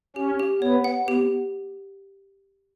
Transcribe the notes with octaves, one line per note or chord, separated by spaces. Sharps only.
C#4 G4
G4
B3 C#5
F#5
B3 G4